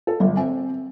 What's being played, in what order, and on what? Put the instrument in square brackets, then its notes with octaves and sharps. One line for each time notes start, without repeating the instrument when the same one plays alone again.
[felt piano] A4
G1
C4